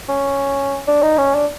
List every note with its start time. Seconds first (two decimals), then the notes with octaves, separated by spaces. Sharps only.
0.09 C#4
0.87 D4
1.02 D#4
1.18 C#4
1.35 D4